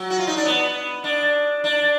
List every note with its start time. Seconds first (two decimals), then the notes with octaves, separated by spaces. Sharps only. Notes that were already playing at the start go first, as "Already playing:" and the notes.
Already playing: F#3
0.10 F#4
0.19 F4
0.27 D#4
0.36 D4
0.45 B3
1.04 D4
1.64 D4